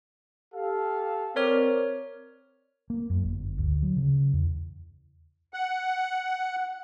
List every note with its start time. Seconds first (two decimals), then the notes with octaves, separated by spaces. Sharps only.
0.55 G4 A4 F5
1.36 C4 A#4 C#5 D5 F6
2.90 A#3
3.10 F#2
3.23 G1
3.58 D2
3.82 F#3
3.97 C#3
4.33 E2
5.54 F#5